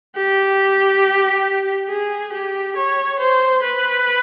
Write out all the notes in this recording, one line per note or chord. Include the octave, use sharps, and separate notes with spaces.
G4
G#4
G4
C#5
C5
B4